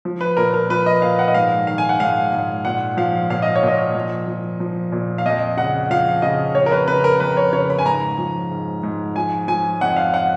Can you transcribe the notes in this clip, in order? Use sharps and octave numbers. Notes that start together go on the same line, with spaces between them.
F3
B4
A#2 A#4
A#4
F3 B4
D#5
A#2 F5
F#5
D#5
G#2 F5
D#3 F5
G#5
F#5
G#2 F5
G#2
A#2 F#5
F3 F5
A#2 F5
D#5
C#5
A#2 D#5
F3
F3
F3
A#2
F5
F2 D#5
C#3 F#5
F3 F5
C#3 D#5
F2 C#5
A#4
B4
C#3 B4
A#4
F2 B4
C#5
C#3 C#5
B5
G#5
G#2 A#5
F3
G#2
G#2
F3 G#5
F3 G#5
F2 F#5
F5
F#5